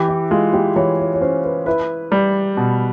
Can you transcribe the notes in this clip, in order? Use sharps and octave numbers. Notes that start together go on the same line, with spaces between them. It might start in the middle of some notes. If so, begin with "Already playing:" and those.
Already playing: E3 G4
E4
G#3 F4
G4
E3 C#5
C#5
C#5
C#4 C5
B4
E4 B4
G3
B2